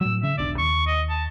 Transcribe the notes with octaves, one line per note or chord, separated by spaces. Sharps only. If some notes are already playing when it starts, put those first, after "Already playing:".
A2 F#3 E6
C#3 E5
E1 B1 D4 D5
D#2 C#6
D#5
A5